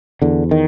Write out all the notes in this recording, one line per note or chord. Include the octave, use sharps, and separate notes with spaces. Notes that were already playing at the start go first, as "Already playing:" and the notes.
E2 D3
D#3